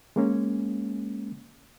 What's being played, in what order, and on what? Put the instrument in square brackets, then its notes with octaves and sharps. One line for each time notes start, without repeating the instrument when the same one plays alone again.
[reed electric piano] G#3 A#3 C#4